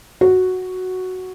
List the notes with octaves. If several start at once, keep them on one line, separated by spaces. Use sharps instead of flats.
F#4